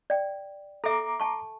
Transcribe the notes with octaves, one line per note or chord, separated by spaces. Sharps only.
D5 G5
A4 E5 A#5 D6
G#5 A5 C#6